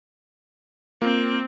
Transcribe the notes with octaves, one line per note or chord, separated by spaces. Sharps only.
A#3 C4 F4